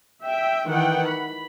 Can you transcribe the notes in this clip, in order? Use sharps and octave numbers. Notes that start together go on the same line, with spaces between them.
E5 G5
D#3 E3 F#5 G5
B5